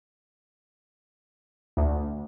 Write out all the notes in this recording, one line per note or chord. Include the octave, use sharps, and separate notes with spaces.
D2